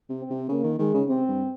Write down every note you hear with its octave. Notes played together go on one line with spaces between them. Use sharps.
C3
C4
C3
C#3 A#3
D#3
D#3 G#3
C#3
C3 C4
G2